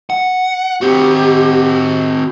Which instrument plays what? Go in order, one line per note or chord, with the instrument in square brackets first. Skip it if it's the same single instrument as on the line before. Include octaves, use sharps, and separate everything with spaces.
[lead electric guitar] F#5
[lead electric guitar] C4 F#4 [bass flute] G4